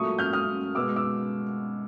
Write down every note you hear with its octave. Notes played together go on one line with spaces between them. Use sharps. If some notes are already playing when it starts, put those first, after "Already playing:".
Already playing: A#2 F#3 A3 C#6 D#6
F6 G6
D#6 F6
B2 G#3 B3 D6 E6
D6 E6